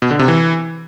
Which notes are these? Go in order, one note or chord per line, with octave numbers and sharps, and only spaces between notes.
B2
D3
C3
E3